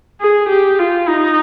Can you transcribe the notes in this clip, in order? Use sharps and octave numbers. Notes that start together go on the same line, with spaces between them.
G#4
G4
F4
D#4